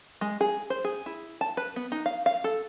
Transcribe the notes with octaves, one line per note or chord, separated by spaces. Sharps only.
G#3
G#4
C5
G#4
E4
A5
B4
B3
D#4
F5
F5
A4